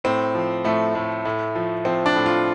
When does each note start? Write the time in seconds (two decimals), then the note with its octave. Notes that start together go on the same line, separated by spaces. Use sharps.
0.04 A2 C4
0.35 F3
0.64 A2 A3
0.95 A2
1.25 A2
1.56 F3
1.85 F3 C4
2.06 D4
2.15 A2
2.26 F4